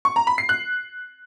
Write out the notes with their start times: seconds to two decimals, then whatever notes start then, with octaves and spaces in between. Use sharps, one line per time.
0.05 C#6
0.16 A#5
0.27 B5
0.38 C7
0.49 F#6